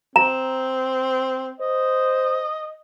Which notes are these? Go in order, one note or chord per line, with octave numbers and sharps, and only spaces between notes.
C4 A#5
C5 D#5